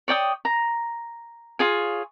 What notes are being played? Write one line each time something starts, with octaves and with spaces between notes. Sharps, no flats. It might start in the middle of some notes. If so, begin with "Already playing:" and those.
C#5 D5 G5 D#6
A#5
F4 G#4 C#5